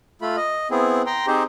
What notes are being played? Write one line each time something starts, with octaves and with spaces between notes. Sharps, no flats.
A3 F4 B5
D#5
B3 C4 E4 G#4
G5 A#5 C6
C4 D#4 G4 G#4 C5